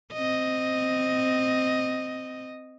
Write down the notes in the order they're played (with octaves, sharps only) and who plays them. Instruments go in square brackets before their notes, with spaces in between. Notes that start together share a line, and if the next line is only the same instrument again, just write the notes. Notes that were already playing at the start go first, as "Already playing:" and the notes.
[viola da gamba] C4 D#5